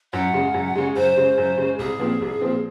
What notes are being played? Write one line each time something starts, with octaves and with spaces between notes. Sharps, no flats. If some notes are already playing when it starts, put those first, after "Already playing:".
F#2 F#5
C#3 G#3
F#2
C#3 G#3
F#2 C5
C#3 G#3
F#2
C#3 G#3
C2 G#4
A#2 F3 C4
C2
A#2 F3 C4